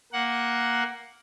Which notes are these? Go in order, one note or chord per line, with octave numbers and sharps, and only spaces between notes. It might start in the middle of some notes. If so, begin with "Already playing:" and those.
A#3 F#5